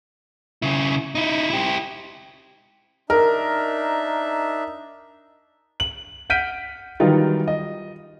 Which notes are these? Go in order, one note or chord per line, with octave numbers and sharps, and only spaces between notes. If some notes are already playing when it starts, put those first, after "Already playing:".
C#3 E4
D#4 E4
E4 G4
D4 D#4 A#4 E5
F#7
F#5 F6 G6 B6 D7 D#7
D#3 E3 F#3 G3 D#4 F4
D#5